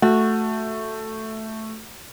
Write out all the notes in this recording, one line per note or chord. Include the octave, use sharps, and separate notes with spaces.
A3 F#4